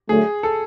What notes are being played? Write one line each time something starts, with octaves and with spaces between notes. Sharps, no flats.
D3 F#3 A3 G#4
A4